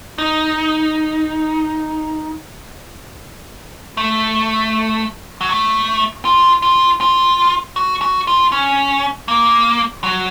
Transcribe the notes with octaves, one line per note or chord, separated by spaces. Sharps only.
D#4
A3
F#3
A3
F4
F4
F4
F#4
F#4
F4
C#4
A#3
F#3